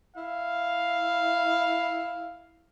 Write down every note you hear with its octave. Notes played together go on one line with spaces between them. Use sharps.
E4 F5